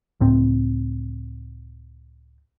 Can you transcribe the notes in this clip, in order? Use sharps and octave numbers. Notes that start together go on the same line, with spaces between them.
C#2 A2 C4